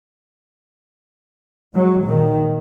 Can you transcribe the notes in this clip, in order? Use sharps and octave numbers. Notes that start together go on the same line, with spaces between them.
F#3 G#3
A#2 D#3